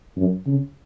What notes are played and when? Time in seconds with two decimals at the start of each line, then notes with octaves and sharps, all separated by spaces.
0.17 F#2
0.47 C#3